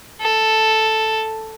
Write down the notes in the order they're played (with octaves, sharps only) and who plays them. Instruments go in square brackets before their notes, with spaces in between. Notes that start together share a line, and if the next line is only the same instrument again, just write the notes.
[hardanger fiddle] A4